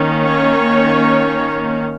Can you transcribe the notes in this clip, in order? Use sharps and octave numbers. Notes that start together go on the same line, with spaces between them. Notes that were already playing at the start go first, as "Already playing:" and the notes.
Already playing: D#3 A#3 C#4
C#5